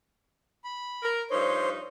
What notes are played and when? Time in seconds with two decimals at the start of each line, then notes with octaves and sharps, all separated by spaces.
0.64 B5
1.03 A#4
1.31 G2 F3 D#4 C5 C#5